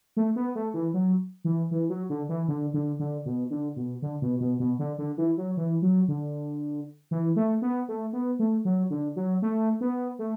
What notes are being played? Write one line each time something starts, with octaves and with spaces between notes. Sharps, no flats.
A3
B3
A3
E3
F#3
E3
E3
F#3
D3
E3
D3
D3
D3
B2
D3
B2
D3
B2
B2
B2
D3
D3
E3
F#3
E3
F#3
D3
E3
A3
B3
A3
B3
A3
F#3
D3
F#3
A3
B3
A3